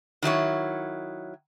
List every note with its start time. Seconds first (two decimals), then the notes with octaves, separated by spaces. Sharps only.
0.22 D#3 F#3 E4 C#5